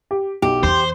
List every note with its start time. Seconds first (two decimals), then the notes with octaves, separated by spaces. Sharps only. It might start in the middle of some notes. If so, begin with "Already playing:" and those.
0.11 G4
0.42 B1 G4
0.63 E2 C5 C6